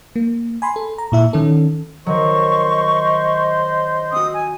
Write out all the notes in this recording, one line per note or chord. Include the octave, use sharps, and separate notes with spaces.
A#3
G#5 B5 C6
A4
A#5
A#2 E4 E5
D#3 C#4 A4
D#3 F#3 C5 D#5 C#6
C4 F#4 D#6
G#5